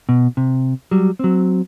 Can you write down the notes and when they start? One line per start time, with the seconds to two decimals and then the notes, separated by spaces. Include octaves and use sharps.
0.09 B2
0.37 C3
0.91 F#3 G3
1.19 F#3 C4